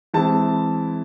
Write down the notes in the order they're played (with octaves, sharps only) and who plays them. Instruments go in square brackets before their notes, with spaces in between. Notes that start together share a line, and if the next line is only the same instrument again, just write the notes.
[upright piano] E3 G#3 C4 E4 A5